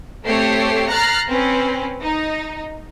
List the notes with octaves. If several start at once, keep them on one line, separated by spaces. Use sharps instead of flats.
A3 C4 G4 A4 C#5 C7
A#5 F6 F#6 A6 A#6 C7
C4 C#4 B4
D#4